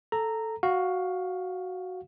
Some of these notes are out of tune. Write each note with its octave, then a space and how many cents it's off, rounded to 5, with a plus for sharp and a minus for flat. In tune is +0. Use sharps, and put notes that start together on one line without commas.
A4 +0 A#5 -10
F#4 +0 F5 +15